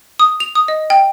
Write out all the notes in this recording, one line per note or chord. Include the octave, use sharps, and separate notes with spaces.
D#6
F7
D#6
D#5
G5